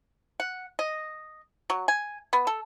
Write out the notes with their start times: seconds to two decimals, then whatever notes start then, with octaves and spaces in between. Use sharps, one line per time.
0.40 F#5
0.79 D#5
1.70 F#3
1.88 G#5
2.33 B3
2.47 A4